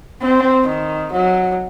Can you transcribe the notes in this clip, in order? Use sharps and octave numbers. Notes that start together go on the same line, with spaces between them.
C4
D#3
F#3